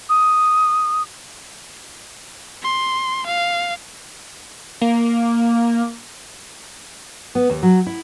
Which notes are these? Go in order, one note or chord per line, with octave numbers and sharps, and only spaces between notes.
D#6
C6
F5
A#3
B3
D#2
F#3
E4